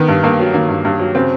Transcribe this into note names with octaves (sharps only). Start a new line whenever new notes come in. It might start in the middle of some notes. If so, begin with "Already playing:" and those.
Already playing: D#3 B3
G2
G2 A#3
F#3
D#3 A#3
G2
G2
F#3
C#3 C4